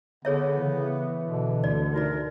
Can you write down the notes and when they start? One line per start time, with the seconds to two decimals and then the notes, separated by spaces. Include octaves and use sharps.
0.25 D3 B3 G#4 C#5 E5
0.58 C#3 E3
1.23 B2 D3
1.64 D2 D5
1.94 C3 D#4 F#4 A#4 D5